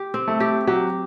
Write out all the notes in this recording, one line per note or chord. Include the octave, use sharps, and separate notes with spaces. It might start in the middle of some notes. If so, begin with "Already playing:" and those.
Already playing: G4
C4
A3
G4
F#3 G4